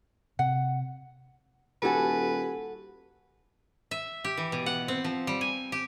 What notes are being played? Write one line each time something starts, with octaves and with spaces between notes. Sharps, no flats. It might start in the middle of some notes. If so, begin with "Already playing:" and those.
C3 F#5
D#1 F#4 G4 A4 B4 G#5
E5
G4
E3
B2
F#5
C4
F3
G3
G#5
G4